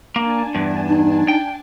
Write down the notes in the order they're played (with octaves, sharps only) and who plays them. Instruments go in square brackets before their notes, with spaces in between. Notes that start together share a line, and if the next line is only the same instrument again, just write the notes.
[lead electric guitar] A#3 [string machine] D4 G#5 A5
[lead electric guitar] E2 G2
[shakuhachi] D#4
[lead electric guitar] G5